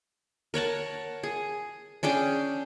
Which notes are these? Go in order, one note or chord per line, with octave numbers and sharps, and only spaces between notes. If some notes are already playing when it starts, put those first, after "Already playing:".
A#4 C#5 F#5 A5
G#4
C#4 D4 G#4 G5